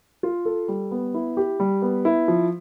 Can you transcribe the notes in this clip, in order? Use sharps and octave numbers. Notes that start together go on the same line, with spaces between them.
F4
A4
G3
B3
E4
G4
G3
B3
E4
F3